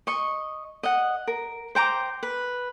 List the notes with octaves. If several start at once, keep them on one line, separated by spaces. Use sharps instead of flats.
D#5 C#6
D#5 F#5
A#4
C5 G5 A#5 D6
B4